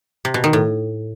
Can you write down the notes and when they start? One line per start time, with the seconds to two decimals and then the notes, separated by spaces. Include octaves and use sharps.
0.25 C3
0.34 B2
0.44 D#3
0.53 A2